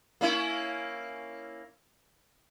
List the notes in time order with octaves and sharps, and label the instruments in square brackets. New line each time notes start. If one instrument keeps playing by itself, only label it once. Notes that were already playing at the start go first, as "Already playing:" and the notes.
[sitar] A#3 C#4 E4